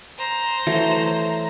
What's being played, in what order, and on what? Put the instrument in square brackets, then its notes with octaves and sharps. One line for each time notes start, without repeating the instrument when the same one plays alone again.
[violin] C5 A#5
[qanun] E3 F#3 A3